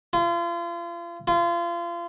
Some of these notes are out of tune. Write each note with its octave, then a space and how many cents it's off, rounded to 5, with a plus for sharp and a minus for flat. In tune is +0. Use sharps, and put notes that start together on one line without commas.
F4 -35
F4 -30